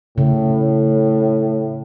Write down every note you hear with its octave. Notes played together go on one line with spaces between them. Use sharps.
A2 C#3